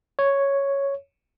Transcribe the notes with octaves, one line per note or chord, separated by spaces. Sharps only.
C#5